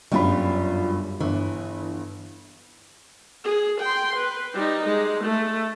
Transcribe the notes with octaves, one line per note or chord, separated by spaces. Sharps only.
G1 F#2 G3 F4 B5
G1 E3
G#4
G5 C6
B4
G3 D#4
G#3
A3